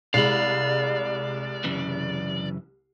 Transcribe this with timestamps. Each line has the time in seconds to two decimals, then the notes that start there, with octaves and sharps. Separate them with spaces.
0.14 C2 G#3 D5 F5 B5
1.64 F#2 C#3 E3